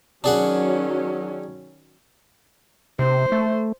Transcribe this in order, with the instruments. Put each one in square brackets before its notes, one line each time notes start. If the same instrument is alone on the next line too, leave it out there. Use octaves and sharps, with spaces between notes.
[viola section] D#3 F#3 C#4 [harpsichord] D4 G#4 F#5
[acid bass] C3 [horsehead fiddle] C5
[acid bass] A3